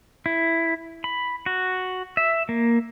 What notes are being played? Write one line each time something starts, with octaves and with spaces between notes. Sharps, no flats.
E4
B5
F#4
E5
A#3